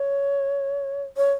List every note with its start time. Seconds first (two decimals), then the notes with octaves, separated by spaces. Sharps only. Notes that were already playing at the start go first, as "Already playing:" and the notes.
Already playing: C#5
1.17 C#5